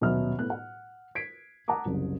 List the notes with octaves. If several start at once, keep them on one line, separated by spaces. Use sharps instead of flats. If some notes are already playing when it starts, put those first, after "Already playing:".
D#1 B2 F#3 B3 E5 F6
A2 B3 F#6
F#5
G#6 B6 C7 D7
F#5 A5 A#5 D6 D#6
F#1 C2